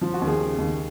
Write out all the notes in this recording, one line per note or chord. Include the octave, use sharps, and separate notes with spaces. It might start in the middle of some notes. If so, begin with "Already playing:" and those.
F3 F4
F#4
D#2
G#4
C#3
D#2